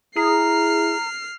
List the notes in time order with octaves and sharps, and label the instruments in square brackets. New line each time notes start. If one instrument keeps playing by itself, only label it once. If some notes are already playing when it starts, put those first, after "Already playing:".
[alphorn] E4 [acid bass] G#4 [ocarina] A#5 [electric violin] F6 C7